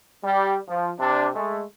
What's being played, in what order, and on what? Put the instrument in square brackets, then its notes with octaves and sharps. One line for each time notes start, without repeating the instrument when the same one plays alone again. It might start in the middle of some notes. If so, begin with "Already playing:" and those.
[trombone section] G3
F3
C3 D4
G#3 A3